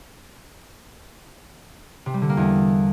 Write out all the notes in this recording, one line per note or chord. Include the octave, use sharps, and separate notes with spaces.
C3
G3
D3
A#3
E2